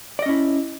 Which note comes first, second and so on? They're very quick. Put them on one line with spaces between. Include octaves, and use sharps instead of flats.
D5 D#5 C#4 E4